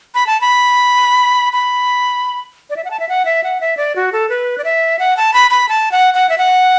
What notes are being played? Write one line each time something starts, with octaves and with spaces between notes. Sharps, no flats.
B5
A5
B5
B5
D5
E5
F#5
A5
E5
F#5
E5
F#5
E5
D5
F#4
A4
B4
D5
E5
F#5
A5
B5
B5
A5
F#5
F#5
E5
F#5